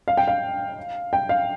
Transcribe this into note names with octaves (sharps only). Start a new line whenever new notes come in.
F5
G5
F5
G5
F5